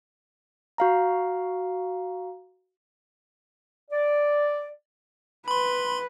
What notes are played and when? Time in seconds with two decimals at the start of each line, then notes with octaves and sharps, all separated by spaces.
0.78 F#4 F5 A#5
3.91 D5
5.48 B4 B5 C6